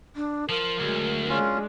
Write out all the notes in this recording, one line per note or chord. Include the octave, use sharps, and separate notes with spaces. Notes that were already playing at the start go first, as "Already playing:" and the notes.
D4
F3 A#4
D2 F#3 G#3
G#3 C#4 D4 F4